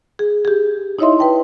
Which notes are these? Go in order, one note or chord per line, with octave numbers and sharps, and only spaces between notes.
G#4
G4 G#4
D#4 E4 C#5 D#5 E5 C6
B4 G5 A5